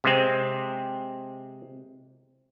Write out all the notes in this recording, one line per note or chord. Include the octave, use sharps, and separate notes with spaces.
C3 G#3 C4